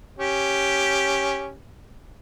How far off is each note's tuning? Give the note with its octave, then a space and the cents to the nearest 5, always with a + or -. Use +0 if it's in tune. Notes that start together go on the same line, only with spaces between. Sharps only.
C#4 -5 G4 +0